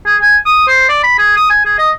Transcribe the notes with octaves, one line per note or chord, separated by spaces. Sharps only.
G#4
G#5
D#6
C5
D5
B5
G#4
D#6
G#5
G#4
D#5